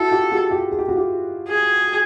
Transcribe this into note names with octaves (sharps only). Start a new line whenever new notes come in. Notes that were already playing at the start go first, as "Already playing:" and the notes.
Already playing: E4 F#4 A4
F4 G4
F#4 G#4
F4 G4
G#4
G4
F#4
F4 G4
G#4